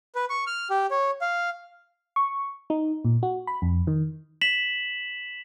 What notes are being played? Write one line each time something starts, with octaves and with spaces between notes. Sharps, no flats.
B4
C#6
F6
G4
C#5
F5
C#6
D#4
A#2
F#4
B5
F2
D#3
B6 E7 F#7